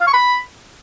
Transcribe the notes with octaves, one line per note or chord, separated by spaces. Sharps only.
F5
C#6
B5